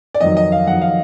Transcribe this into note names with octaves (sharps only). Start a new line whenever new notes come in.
D5
F2 D#3 F#3 D#5
D#5
F5
F2 D#3 F#3 F#5
F5